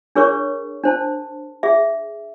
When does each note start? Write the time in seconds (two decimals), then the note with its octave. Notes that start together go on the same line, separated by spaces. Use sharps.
0.16 D4 G#4 A#4 C#5 C#6
0.84 D4 C5 A5
1.63 G#4 E5